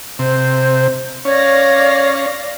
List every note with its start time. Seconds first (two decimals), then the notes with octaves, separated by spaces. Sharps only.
0.19 C3 C5
1.25 C#4 C#5 D5 F5 A#6